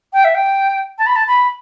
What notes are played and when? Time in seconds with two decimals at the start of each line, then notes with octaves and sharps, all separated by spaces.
0.13 G5
0.24 E5
0.34 G5
0.98 A5
1.06 B5
1.15 A5
1.27 B5